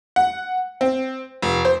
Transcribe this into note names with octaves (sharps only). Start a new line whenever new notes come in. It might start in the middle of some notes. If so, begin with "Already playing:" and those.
F#5
C4
F1
C5